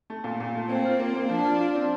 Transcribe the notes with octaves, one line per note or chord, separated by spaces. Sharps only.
A3
A#2
A#2
A3
A#3 C4
F4
A#3 C4
A#3
F3 D4
F4
F4
C4